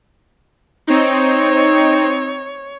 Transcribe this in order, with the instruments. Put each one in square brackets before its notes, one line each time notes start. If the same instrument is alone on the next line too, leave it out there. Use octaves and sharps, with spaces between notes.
[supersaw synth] C4 D#4 [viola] C#5